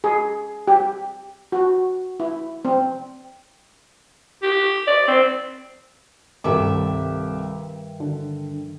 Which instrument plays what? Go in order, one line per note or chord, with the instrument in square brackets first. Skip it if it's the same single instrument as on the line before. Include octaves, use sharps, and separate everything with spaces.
[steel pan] G#4
G4
F#4
E4
C4
[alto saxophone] G4
D5
C4
[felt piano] C2 A4 D6 [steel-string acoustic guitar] G2 D#3 E5
[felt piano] D3